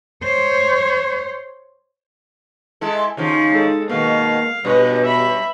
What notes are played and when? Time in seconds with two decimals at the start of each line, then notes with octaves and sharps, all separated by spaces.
0.23 C5 C#5
2.81 G#3 E4 A4
3.17 D#2 C#3 F3 D#4
3.51 G#3 A4
3.90 B2 D#3 A#3 F5
4.65 G2 B2 G3 B4 C#5 D#5
5.04 E5 B5